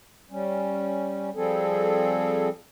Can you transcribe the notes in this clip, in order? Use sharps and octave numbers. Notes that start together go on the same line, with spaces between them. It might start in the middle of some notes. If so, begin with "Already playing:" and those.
G3 C#4
F3 G3 C4 G#4 A4